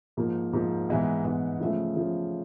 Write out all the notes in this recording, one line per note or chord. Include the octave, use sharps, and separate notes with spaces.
G#2 F3 A#3
G#2 F3 A#3
G#2 E3 G#3 B3
G#2 E3 G#3 B3
C#3 F3 A3
C#3 F3 A3